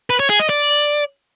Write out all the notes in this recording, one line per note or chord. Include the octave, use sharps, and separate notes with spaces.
B4
C#5
G#4
D#5
D5